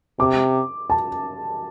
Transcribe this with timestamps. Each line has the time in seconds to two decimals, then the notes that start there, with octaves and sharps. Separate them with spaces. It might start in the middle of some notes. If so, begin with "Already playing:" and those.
0.19 C3 D6
0.90 A5